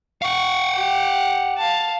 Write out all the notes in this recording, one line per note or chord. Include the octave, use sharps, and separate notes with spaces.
F5 F#5 C#6
G4
F5 A5